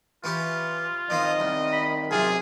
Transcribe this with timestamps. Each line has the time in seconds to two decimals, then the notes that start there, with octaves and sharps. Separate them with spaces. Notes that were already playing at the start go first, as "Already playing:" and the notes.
0.24 E3 C#4 F4 G4
1.10 D#3 F3 C4 D#5
1.40 C2
1.73 B5
2.11 F#2 C3 F4 G#4